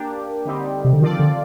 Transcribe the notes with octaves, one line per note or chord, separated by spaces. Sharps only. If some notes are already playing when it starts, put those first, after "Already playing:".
Already playing: A#3 D4 G4
D3 G3 C4 D#4 G4
C3
D3
D#3 F3 C4 F4 A4 D5
D3